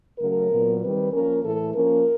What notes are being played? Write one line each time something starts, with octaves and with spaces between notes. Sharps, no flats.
C#3 F#3 A3 C#4 A#4
A#2 F#3 B3
D#3 G3 C4 B4
F3 A#3 C#4 A#4
A2 E3 A3 A4
F3 A#3 C#4 A#4